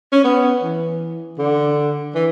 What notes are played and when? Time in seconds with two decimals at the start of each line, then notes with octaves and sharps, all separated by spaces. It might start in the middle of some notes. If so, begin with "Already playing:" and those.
0.12 C#4
0.24 B3
0.63 E3
1.39 D3
2.15 E3